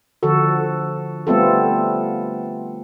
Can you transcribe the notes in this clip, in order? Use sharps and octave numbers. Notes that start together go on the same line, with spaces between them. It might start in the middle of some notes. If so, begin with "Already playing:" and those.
D3 F3 F#4 A4
G3 A3 B3 C4 F4 A4